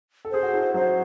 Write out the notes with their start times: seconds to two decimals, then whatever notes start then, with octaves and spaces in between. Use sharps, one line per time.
0.25 A4
0.31 G#4 C5
0.43 F#4
0.54 E4
0.74 F#3 C5